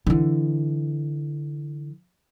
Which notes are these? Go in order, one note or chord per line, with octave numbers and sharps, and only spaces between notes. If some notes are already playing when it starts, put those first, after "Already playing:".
D3 E3